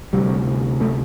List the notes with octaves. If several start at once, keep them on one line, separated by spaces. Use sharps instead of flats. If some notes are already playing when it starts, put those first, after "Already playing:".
D2 C3 G3
A3